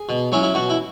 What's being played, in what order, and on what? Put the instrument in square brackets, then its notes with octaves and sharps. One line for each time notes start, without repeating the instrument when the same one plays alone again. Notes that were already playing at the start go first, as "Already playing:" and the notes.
Already playing: [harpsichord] G#4
B2
F#3 C#4 E4
E4
B2 F#4
E4